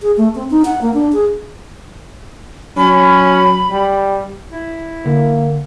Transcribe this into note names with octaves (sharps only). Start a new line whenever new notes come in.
G#4
A3
C4
D#4
F#5
A#3
D4
G#4
F#3 C#4 B5
G3
E4
D3 A#3